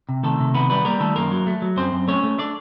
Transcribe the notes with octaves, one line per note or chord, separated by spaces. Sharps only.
C3
D#3 A3 A4
C3
D#3 B3 B4
G3 B3 B4
G3 A#3 A#4
D#3 A3 A4
F#2 A#3 A#4
F#3
A3
F#3
F#2 C4 C5
F#2
A3 C#4 C#5
A3
A3 D4 D5